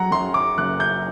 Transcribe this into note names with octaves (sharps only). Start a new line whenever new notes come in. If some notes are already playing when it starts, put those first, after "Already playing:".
Already playing: F#3 F#5 A#5
F#2 C6
D6
F#1 F#6
G6